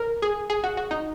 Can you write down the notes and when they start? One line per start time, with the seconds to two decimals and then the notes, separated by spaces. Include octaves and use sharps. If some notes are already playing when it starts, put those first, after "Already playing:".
Already playing: A#4
0.22 G#4
0.50 G#4
0.64 F#4
0.77 F#4
0.91 D#4